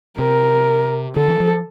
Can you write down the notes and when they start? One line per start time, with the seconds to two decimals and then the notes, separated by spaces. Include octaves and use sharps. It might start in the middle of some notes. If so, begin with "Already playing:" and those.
0.18 C3 A#4
1.16 D3 A4
1.28 E3
1.40 F3